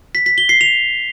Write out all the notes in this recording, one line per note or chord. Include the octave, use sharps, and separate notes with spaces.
B6
B6
G7
C7
F7